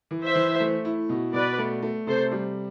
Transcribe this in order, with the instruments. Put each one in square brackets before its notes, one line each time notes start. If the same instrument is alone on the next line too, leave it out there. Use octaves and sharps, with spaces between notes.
[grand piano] E3
[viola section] C5 E5
[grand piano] E3
A3
E4
B2
[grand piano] B2 [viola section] B4 D5
[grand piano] A3
A3
[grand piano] C3 [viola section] A4 C5
[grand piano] G3